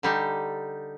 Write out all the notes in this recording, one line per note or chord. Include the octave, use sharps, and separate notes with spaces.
D3 G3 D#4